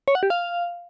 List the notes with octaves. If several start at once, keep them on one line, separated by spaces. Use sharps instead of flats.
C#5
F#5
G4
F5